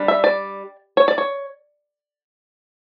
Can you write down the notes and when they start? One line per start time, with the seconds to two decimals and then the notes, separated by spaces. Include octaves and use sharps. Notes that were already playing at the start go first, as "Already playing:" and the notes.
Already playing: G3 D4
0.08 E5
0.24 D5
0.97 C#5
1.08 D5
1.18 C#5